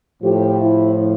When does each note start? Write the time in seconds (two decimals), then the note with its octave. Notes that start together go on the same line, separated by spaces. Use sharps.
0.22 A2 F3 G4
0.60 E4